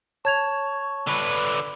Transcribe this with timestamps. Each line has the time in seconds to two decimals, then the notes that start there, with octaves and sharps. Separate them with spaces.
0.25 C#5 A5 C#6 G#6 F7
1.07 D3 B4